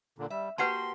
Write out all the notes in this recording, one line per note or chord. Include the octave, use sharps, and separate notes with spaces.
A#2 D3
G3 E5
A#3 F#4 G4 B4 F#5 A5 C6